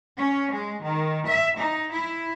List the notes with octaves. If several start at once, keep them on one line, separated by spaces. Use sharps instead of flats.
C#4
G#3
D#3
E5
D#4
E4